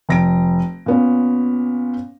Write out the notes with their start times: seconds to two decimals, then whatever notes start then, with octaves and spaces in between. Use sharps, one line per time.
0.09 F1 A#6 D7
0.86 A#2 B3 C#4